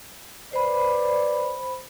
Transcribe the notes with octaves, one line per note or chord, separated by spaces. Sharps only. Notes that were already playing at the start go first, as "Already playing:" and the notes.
B4 C5 D5 B5